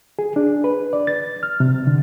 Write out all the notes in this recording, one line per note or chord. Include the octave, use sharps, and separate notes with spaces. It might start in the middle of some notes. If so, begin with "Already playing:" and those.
G#4
D4
B4
D5
A6
F6
C3
D3